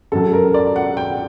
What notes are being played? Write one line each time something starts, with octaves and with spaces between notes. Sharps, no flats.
F#2 F#3 A4
A#4
D5
F#5
G5